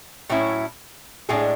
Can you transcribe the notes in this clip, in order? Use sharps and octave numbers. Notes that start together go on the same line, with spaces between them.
A2 F#3 C#4 E4
A2 G#3 D4 G#4